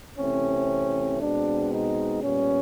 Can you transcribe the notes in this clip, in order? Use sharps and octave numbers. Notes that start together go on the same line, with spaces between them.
C3 E3 A3 C4 C#4
B2 G#3 C4 D4
D#4
A#2 G3 B3 C#4